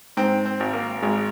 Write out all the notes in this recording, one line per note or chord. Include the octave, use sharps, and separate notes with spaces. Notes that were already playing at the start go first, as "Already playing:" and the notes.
G#2 C4
C4
G#1
A#3
G#1 G#3